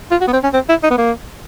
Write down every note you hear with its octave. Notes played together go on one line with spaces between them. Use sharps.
F4
F#4
B3
C4
C#4
C4
E4
D#4
B3
A#3